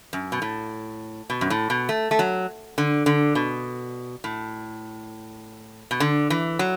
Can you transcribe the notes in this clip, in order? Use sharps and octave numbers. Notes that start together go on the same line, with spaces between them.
F#2
B2
A2
B2
F#2
A2
B2
A3
A3
F#3
D3
D3
B2
A2
B2
D3
E3
F#3